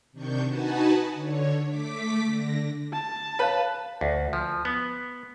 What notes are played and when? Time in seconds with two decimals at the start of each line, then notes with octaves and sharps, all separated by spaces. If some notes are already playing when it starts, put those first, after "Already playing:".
0.13 C3 D#3 D4 C#6 G6
0.46 D#4 F#4 B4 F#5 G#5 A5
1.13 D3 C#5
1.67 A3 D6 B6
2.25 D3 A#6
2.92 A5
3.39 B4 C#5 F5
4.01 D2
4.33 F3
4.65 B3